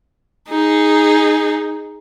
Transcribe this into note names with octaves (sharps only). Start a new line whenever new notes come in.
D#4 G#4